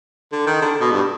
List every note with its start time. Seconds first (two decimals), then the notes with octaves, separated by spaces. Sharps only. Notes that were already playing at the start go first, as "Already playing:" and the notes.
0.32 D3
0.47 D#3
0.62 D3
0.81 B2
0.92 G2